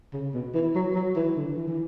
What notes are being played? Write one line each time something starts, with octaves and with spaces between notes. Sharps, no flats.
C#3
B2
E3
F#3
F#3
E3
D3
E3
E3